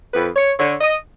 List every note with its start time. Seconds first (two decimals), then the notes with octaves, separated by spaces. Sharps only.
0.14 F2 B4
0.36 C#5
0.58 D3 C#5
0.81 D#5